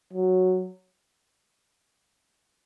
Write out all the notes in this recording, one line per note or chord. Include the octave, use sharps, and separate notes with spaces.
F#3